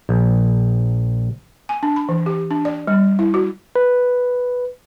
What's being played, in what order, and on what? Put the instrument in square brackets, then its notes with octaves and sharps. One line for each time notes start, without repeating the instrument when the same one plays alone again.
[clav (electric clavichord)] A#1
[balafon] G#5
D4
B5
E3
G4
D4
D5
G3
E4
F#4
[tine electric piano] B4